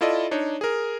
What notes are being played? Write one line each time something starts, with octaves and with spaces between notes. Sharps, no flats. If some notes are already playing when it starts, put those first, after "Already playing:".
E4 F4 A4 D5 D#5
D4 D#4 C#5
G#4 A#4